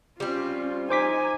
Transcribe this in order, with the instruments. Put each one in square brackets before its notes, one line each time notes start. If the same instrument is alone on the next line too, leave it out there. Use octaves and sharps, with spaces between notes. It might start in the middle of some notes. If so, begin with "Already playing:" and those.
[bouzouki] G3 C4 [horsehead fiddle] C#4 F4
[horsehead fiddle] D#4 G#5 [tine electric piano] C5 D6 B6